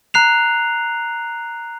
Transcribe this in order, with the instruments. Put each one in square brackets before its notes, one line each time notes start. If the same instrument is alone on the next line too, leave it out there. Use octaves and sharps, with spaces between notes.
[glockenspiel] A#5 F#6 C7 F7